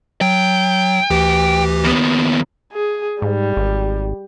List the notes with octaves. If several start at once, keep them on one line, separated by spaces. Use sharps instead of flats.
F#3 G5
D2 E3 G4
D#2 B3
G#4
G#2 G3
G#1